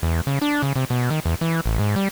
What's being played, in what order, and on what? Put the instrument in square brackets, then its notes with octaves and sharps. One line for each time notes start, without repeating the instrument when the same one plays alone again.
[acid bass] E2
C#3
D4
C#3
C3
B2
D#3
E2
E3
A1
G#2
G3